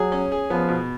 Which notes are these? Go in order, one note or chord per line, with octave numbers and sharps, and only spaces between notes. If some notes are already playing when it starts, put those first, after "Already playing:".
Already playing: F#3 G#4
C#4
G#4
F3 B3
B2